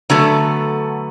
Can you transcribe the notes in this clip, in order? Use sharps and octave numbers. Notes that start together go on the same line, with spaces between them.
D3 F#3 A3 B3